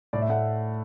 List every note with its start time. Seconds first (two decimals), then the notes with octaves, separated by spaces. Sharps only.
0.13 A2 D5
0.22 E5
0.29 A3 F#5